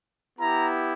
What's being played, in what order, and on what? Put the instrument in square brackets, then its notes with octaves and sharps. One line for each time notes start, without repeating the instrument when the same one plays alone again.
[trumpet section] B3 E4 G4 A#5